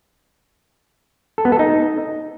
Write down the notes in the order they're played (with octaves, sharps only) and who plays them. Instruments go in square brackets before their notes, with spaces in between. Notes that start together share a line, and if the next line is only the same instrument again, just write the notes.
[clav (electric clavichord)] A4
B3
A4
D#4